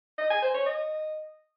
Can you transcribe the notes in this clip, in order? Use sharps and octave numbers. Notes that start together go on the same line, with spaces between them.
D#5
G#5
C5
C#5
D#5